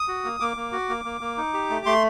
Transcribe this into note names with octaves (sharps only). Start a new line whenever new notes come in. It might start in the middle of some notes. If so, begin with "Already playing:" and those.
Already playing: D#6
F#4
A#3
A#3 D6
A#3
F#4
A#3
A#3
A#3
D#4
G4
A3
A3 C6